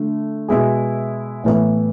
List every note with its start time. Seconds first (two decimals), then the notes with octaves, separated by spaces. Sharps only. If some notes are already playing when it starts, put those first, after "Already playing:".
Already playing: D3 A3
0.49 B2 G#3 B3 E4 G#4
1.44 A2 E3 B3 E4